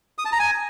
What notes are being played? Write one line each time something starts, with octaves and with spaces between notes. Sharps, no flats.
D#6
A5
A#5
G#5